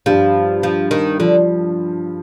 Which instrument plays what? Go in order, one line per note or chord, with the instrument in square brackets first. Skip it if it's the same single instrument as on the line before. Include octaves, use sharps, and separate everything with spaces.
[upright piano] G2 G3 [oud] F3
[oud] F3
D#3
[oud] D3 [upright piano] F3